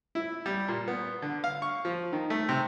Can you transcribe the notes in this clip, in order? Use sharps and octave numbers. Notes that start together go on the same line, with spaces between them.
E4
G3
A#2
B3
D3
F5
C#6
F3
D#3
A3
C3